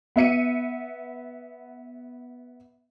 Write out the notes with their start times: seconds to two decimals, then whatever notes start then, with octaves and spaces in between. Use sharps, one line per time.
0.16 B3 E5 C#7 D#7